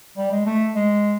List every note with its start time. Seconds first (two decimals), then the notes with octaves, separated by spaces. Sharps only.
0.17 G3
0.32 G#3
0.46 A3
0.75 G#3